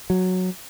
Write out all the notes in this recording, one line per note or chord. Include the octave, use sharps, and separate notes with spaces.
F#3